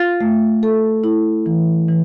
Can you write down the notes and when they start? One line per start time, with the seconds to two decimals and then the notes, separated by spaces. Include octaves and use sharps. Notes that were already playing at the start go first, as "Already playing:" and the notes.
Already playing: F4
0.21 A3
0.63 A4
1.04 E4
1.46 E3
1.88 E3